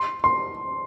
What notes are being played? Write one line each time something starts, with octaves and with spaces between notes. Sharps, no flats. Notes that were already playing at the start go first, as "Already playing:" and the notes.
Already playing: C6
C6